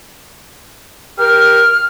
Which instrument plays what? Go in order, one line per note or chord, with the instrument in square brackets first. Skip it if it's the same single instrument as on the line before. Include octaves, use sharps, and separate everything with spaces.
[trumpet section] G4 A#4 [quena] F6